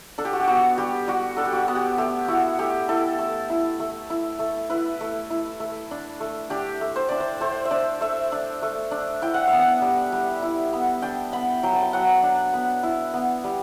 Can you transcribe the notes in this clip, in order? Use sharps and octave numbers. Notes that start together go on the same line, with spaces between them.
D4 A4
G4
F#4
G4
B3 F#4
G3 G4
G3 F#4
D4 A4
G4
F#4
B3
G4
A3 G4
E4 F#4
A3 G4
E4 A4
A3
E4
A3
E4
A3
E4 B4
A3
E4
A3
D4
A3
D4 G4
A3
C5
D4 D5
C5
A3 C5
E5
D4 D5
A3 E5
D4
A3
D4
E4 G5
F#5
E5
B3
F#5
G3
G3
E4
B3
D4 G5
B3 B5
F#3 G5
A5
G5
F#3 F#5
D4
B3
E4
B3
G3